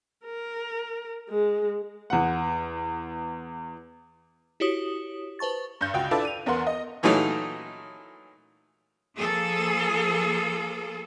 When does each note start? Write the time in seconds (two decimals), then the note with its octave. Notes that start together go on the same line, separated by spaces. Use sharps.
0.25 A#4
1.29 G#3
2.10 E2 F#5
4.60 E4 F#4 G4 C#5 D#6
5.39 B4 C5 A5 C#6 A6
5.81 G2 G6
5.94 C#2 F#4 G5
6.11 D4 E4 F4 A4 B4 D5
6.25 D#7 F7
6.46 E2 B3 A#4 F#5 C6
6.67 D#5
7.03 A#2 E3 F#3 A3 C#4 D#4
9.16 F3 A#3 G#4 A4